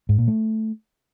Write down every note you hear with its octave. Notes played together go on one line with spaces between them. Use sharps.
G#2
A#2
A3